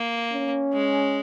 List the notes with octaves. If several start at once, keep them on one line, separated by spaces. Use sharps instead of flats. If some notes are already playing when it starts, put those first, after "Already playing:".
Already playing: A#3
C#4
G#3